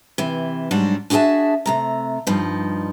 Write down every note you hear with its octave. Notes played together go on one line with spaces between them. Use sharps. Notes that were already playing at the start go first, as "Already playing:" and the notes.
C3 E3
G#2 F#3 G3 D4 F#4
D4 F#4 G#4 C#5 E5 A5
C3 A3 A#5
G2 F3 D#4